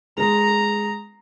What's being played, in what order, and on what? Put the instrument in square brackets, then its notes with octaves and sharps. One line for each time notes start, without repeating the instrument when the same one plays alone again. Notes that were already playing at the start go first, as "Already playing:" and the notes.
[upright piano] G#3 [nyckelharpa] A#5